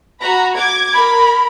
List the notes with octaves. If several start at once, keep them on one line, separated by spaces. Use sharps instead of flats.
F#4 A#5 B5
D6 G#6
A#4 B5